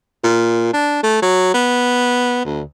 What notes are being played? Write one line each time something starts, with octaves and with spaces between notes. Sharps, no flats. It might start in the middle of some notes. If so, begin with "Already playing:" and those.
A#2
D4
A3
F#3
B3
D2